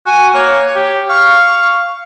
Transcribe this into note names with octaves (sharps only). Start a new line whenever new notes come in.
F#4 G#5
A#3 C#5
G4
F5 C#6